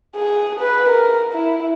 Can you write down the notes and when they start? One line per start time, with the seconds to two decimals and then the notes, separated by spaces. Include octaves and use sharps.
0.16 G#4
0.60 B4
0.89 A#4
1.33 E4